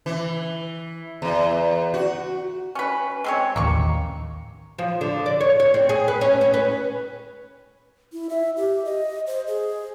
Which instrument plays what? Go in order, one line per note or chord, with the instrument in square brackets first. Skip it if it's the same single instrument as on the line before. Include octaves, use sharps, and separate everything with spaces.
[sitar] E3
E2
F#4
[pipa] C#4 B4
G#3 C4 C#5
[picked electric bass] A1 D#2 [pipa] A#3 C#6
[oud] F3
D3
D5
C#5
C#5
C4
G#4
B4
C#4
C#4
B4
[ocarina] E4
E5
G4
D#5
C5
G#4